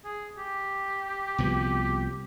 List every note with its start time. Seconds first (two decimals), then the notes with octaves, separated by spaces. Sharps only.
0.04 G#4
0.37 G4
1.38 C2 B2 F3